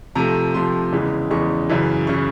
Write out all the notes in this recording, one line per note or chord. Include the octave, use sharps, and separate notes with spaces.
C3 F3 A3 A#5
C3 F3 A3 C6
E2 C#3 E3 G#3
E2 C#3 E3 G#3 C#6
F#2 C#3 E3
C#3 E3 C#6